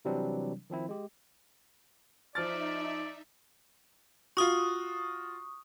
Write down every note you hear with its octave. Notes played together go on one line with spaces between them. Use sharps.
C3 E3 F#3 G3 C4 D4
D#3 F3 C4 E4
G#3 G4
F3 D#4 D5 E5 F6 A6
F4 F#4 C#6 D#6